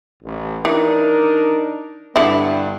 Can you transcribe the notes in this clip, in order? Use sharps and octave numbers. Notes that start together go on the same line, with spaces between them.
A1
E3 D4 D#4 A#4
G2 D3 B3 E4